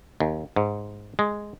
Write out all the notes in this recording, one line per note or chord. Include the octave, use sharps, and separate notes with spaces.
D#2
G#2
G#3